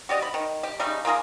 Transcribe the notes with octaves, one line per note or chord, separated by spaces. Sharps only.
F#4 G4 D5 D#5
B5
D#3
G4
C#3 G3 A3 D#4
A#3 F4 G#4 A#4